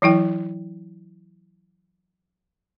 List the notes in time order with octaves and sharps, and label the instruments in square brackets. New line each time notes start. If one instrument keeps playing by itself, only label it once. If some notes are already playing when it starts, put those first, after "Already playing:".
[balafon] E3 F#3 E4 G5